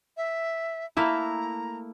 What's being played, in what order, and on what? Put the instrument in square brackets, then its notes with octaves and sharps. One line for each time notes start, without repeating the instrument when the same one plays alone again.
[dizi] E5
[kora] A3 A#3 E4 [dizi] A#5